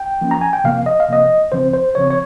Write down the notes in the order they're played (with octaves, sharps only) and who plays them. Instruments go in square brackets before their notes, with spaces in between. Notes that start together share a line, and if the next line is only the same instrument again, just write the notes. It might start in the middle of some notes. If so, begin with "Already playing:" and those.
Already playing: [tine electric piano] G5
F3 A#3 C#4
A#5
G#5
G5
C3 F3 A#3 F5
D#5
F5
C3 F3 A#3 D#5
C#3 F3 C4 C5
C5
C#3 F3 C4 C#5
C#5